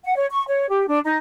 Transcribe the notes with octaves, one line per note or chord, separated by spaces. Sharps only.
F#5
C#5
C#6
C#5
G4
D4
D#4